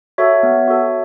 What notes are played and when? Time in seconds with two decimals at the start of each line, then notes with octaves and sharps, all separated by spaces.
0.18 F#4 A4 C#5 E5
0.43 B3
0.68 F#4 A4